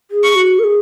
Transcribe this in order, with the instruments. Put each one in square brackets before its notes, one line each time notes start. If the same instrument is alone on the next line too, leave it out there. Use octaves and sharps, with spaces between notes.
[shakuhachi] G#4
[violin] C#6
[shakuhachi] F#4
A#4
G#4